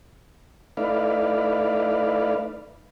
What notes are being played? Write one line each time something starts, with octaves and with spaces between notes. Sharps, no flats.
A3 D#4 E4 B4 D5 F5